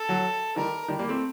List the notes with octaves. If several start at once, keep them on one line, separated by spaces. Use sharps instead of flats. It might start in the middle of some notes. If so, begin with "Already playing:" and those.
Already playing: A4
F#3
D#3 G3 A#4
D#3 G3
G3 A#3
A3 C4